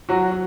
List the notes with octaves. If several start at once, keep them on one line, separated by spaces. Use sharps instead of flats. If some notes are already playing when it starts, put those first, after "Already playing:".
F#3 F#4
F#3